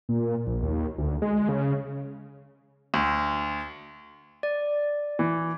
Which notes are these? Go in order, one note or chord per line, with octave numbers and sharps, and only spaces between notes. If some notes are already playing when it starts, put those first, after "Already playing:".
A#2
A#1
D#2
D2
G#3
C#3
D2
D5
E3